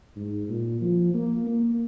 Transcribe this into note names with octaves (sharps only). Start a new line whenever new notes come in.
G#2
A#2
F3
A#3
A#3